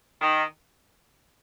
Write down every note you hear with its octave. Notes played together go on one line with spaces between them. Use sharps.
D#3